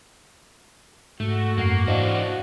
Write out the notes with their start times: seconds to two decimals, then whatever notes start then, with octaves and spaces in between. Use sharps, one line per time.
1.20 G#2 A3 F#4
1.58 F#2 A#3 F#5 C7
1.88 E3 D4 C5 D#5 F5